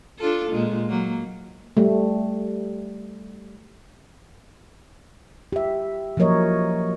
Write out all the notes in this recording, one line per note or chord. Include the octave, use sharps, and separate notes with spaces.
D4 F4 A4
A#2 G#3
F#3 A#3
G3 A3
G4 E5
F3 F#3 A#3 A#4 C#5 D#5